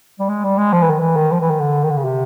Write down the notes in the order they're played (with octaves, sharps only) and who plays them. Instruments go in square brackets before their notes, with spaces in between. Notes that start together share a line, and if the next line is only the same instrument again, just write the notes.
[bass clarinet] G3
G#3
G3
G#3
F3
E3
D#3
E3
D#3
F3
E3
D#3
D3
D#3
D3
C#3
C3